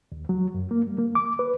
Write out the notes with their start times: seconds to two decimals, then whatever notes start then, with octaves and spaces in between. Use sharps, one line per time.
0.12 D#2
0.29 F#3
0.54 F#2
0.71 A#3
0.87 G3
0.98 A#3
1.15 D6
1.39 B4